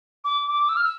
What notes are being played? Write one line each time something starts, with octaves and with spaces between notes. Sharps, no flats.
D6
D6
E6
F6
E6